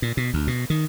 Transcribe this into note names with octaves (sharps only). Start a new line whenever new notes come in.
A#2
B2
D2
B2
D#3